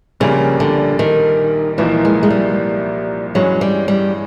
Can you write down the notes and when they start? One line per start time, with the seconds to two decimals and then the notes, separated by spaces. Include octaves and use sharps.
0.20 A#1 A#2 C#3 G3 A#3
0.60 D3
0.99 D#3
1.78 C2 A#2 E3 F3 A#3 D#4
2.05 G#3
2.23 G#3
2.30 G3
3.35 G2 E3 F#3 G#3 C#4
3.61 G3
3.88 G3